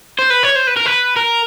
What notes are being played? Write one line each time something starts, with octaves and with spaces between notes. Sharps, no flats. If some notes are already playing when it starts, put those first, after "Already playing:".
C5
B4
C#5
C5
B4
A#4
B4
A#4